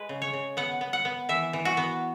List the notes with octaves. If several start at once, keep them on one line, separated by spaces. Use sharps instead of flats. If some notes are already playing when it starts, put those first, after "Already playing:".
Already playing: G#3 B4
C#3
C#5
C#3
B3 F#5
B3
F#5
B3
E3 E5
E3
F#4
B3